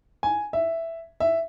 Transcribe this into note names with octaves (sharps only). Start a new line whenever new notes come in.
G#5
E5
E5